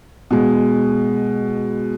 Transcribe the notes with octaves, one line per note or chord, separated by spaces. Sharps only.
B2 G#3